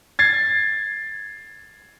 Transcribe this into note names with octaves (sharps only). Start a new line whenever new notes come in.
G#6 A6 C7